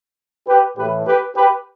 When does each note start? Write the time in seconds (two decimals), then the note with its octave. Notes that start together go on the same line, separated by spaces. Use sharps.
0.47 G4 B4
0.76 A2 E3 A3 G4 B4
1.06 G4 B4
1.35 G4 B4